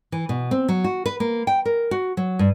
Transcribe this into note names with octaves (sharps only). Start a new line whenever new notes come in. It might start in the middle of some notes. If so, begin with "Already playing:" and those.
E3
B2
C4
F#3
F#4
B4
A#3
G5
A#4
F#4
F#3
G2